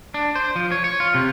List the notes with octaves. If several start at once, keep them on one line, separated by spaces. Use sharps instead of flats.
D4
C5
F3
C#5
C#5
F4
C3